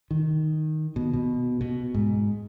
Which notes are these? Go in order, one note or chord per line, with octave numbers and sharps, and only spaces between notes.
D#3
B2
B2
B2
G#2